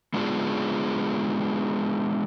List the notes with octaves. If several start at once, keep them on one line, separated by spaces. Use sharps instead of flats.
G#3 B3 D4 F4 F#4 G#4